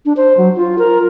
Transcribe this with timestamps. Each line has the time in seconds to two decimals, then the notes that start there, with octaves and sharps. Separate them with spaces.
0.05 D4
0.17 C5
0.37 F#3
0.56 F4
0.79 A#4